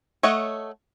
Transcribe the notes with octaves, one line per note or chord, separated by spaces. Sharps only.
A3 C#5 D#5 F#5